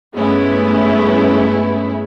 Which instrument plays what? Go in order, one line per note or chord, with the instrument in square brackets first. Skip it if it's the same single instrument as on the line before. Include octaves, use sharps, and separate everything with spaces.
[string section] G2 G#3 A3 B3 C#4 E4